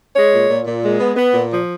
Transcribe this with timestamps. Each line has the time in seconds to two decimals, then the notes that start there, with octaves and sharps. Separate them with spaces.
0.15 G#3 C#5
0.32 A#2
0.49 A#2
0.66 A#2
0.83 G#3
0.99 B3
1.16 B3
1.34 A#2
1.50 F3